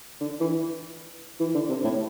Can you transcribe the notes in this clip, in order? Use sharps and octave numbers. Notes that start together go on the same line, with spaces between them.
D3
E3
E3
D3
C3
A2